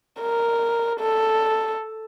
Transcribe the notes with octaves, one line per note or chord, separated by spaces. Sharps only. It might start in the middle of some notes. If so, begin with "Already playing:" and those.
A#4
A4